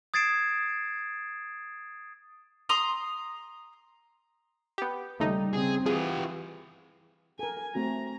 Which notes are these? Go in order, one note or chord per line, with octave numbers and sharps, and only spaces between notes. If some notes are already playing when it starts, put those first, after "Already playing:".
D#6 G#6 A6 C7 D7 E7
A#5 C6 D#6
B3 G4
D#2 C#3 G3 A3 D#4
C#3 C4 G#4
E3 F4 G4 G#4
A4 A#4 G#5
A3 C4 F#4 A#5